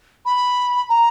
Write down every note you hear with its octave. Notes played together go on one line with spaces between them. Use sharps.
B5
A#5